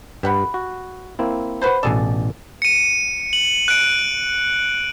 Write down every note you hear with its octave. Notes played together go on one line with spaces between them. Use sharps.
G2 G4 F#5 B5
F#4
A#3 C4 E4
F#4 B4 C5
A1 B2 D4 G#4 A4 D5
C#7 D#7
F#7
F#6 D7